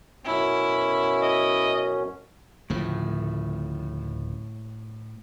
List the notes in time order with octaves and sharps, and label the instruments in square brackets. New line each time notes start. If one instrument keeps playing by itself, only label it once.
[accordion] F#2 B2 C#4 [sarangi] E4
[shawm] D#5
[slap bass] D1 C#3 F3 [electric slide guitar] A2